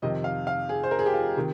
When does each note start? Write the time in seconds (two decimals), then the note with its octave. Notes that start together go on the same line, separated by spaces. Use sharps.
0.02 F2 C3 D#3 D#5
0.24 F5
0.47 F5
0.69 G#4
0.83 C5
0.91 A#4
0.99 G#4
1.06 G4
1.14 F4
1.37 C3 D#3